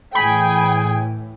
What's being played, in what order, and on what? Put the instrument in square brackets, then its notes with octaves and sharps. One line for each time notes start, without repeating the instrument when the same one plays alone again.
[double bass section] A2 E3 [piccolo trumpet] G#4 [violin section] G5 G#5 [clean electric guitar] B5